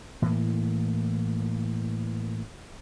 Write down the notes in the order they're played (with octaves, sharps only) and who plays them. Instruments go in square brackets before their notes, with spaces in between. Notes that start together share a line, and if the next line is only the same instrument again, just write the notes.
[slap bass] A2 E3 A#3